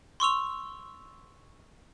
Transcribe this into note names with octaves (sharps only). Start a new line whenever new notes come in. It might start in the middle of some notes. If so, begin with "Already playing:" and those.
C6 C#6 E6 F7